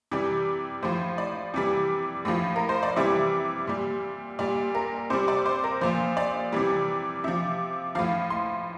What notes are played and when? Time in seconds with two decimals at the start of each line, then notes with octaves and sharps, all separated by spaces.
0.12 C3 E3 G3
0.83 A2 F3 C5
1.18 D5
1.54 C3 E3 G3
2.25 A2 F3
2.56 A#4
2.69 C5
2.83 D5
2.96 C3 E3 G3 E5
3.67 A#2 G3
4.39 A#2 G3 D5
4.75 A#4
5.10 C3 G3 C5
5.28 D5
5.46 C5
5.64 A#4
5.81 A#2 F3 C5
6.17 D5
6.52 C3 E3 G3
7.24 C3 F3 E5
7.95 A2 F3 F5
8.30 C6